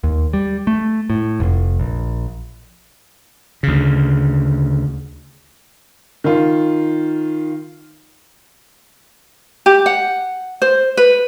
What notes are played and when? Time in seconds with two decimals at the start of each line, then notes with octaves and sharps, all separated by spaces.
0.03 D#2
0.33 G3
0.67 A3
1.10 A2
1.40 F1
1.80 A#1
3.63 D2 C#3
6.24 D#3 F4
9.66 G4
9.86 F#5
10.62 C5
10.97 B4